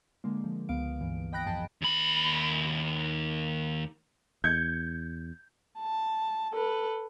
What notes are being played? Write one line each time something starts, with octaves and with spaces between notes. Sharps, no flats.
D3 G#3 A#3
D3 F3
C#2 B3 F5 D7
G2 E3
D#5 G5 B5 F#6 A#6 D7
G#1 F#2 F3 G#4 G5 A5
D#2 B5
E2 G6 G#6 C#7
A5
A4 B4